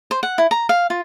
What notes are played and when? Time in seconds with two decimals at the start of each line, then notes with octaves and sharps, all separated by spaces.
0.11 C5
0.23 F#5
0.38 E4
0.51 A#5
0.69 F5
0.90 F4